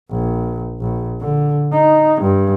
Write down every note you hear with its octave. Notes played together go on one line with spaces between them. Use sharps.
A#1
A#1
D3
D#4
G2